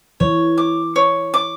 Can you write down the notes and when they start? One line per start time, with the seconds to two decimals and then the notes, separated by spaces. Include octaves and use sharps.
0.20 E3 C#5
0.58 D6
0.96 C#5
1.34 D6